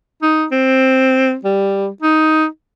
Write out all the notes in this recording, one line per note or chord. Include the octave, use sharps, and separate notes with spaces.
D#4
C4
G3
D#4